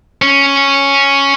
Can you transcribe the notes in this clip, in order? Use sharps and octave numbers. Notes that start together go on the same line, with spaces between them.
C#4